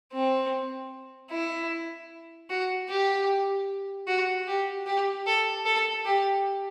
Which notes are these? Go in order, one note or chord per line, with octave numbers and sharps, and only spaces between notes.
C4
E4
F#4
G4
F#4
G4
G4
A4
A4
G4